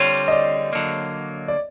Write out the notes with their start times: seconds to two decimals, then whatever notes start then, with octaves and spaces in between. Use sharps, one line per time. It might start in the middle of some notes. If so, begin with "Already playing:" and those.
Already playing: D3 G3 C4 F4 C#5
0.28 D#5
0.31 D5
0.73 D3 F#3 A#3
1.48 D5